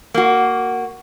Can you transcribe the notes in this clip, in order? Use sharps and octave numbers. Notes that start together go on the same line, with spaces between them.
A#3 F#4